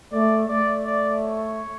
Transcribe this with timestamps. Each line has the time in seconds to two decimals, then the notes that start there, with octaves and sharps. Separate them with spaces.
0.12 A3 D5
0.48 A3 D5
0.85 D5
1.21 C#5